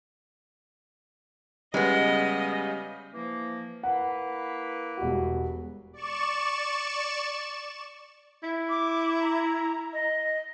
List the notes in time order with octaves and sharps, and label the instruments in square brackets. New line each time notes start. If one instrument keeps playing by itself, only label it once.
[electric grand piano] C#3 G3 [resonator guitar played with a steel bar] G#3 B3 [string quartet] D#5
[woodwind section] E3 F3 A#3
[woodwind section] A#3 E4 B4 [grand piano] F#5
[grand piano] E1 G3 F#4
[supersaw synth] D5 C#6 E7
[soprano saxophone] E4
[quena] D6
A#5
D#5